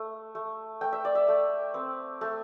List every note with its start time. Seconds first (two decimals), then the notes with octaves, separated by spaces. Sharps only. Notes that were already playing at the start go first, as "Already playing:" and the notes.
Already playing: A3
0.35 A3
0.81 A3 G5
0.93 E5
1.05 D5
1.15 E5
1.28 A3
1.74 C4
2.21 A3